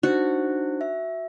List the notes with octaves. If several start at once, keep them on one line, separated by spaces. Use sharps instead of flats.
D4 D#4 F#4 C5
E5